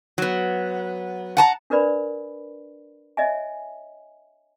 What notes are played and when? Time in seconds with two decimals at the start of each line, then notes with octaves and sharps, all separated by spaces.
0.18 F#3 B3
1.37 F#5 A5 A#5
1.70 D4 A#4 B4 D5 B5
3.17 C#5 D#5 E5 G#5